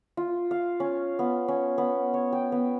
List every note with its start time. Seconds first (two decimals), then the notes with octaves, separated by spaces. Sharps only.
0.17 F4
0.51 F5
0.80 C#4
1.19 B3
1.48 C#4
1.78 B3
2.14 C#5
2.33 G5
2.52 B3